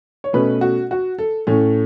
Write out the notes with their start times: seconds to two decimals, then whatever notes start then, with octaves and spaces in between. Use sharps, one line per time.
0.24 C#5
0.33 B2 A3 C#4 B4
0.61 F#4
0.91 F#4
1.18 A4
1.47 A2 A3 C#4